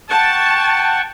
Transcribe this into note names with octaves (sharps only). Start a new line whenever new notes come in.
F#5 G5 A5 C#6